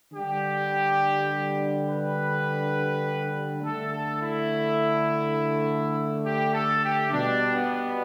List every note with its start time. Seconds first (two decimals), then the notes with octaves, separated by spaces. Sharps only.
0.13 D3 G3 G4
1.88 B4
3.62 D3 A3 A4
3.92 A4
4.21 E4
6.24 G4
6.54 A4
6.83 G4
7.11 B2 G3 D4
7.55 B3